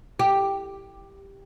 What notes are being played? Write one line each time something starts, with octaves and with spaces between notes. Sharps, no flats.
G4